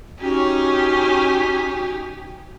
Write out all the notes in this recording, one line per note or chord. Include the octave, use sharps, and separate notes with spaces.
C#4 D#4 F#4 G4 G#5